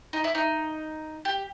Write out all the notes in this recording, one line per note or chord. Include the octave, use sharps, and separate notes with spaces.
D#4
E4
D#4
G4